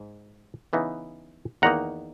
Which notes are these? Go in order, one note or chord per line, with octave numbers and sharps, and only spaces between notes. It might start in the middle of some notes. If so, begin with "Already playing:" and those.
Already playing: G#2
C#3 E3 B3 D#4
E2 D#3 A#3 D#4 F#5 A#5